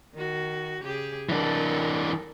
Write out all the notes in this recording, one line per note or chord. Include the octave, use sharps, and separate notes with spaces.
D#3 F#4
C#3 G4 G#4
E3 D4 A4 A#4